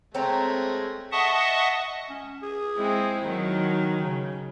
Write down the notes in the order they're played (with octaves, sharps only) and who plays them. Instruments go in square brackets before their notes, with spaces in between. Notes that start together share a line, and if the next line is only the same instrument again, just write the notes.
[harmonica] G#3 A3 [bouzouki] C4 C#5 A#5
[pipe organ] D#5 E5 F#5 A5 C#6 D#6
[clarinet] C#4
G#4
[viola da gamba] G#3 C4 E4
[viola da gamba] D#3 F#3 [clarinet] D#4
[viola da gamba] C#3